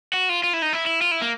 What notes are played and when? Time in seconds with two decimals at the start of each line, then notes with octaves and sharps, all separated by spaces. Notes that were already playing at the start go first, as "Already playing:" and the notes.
0.13 F#4
0.29 F4
0.44 F4
0.53 E4
0.62 D#4
0.73 E4
0.86 E4
1.02 F4
1.11 E4
1.22 A#3